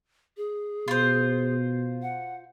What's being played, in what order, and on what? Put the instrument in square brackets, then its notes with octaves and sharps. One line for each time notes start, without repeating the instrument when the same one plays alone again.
[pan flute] G#4
[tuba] B2 [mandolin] F4 C5
[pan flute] F#5